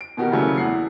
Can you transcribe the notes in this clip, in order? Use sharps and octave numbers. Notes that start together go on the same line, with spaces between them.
D7
B2 D#3 F#4 G4 A#4
C#3 E3 F#3 G3 A3 C#4
E2 F#5 C7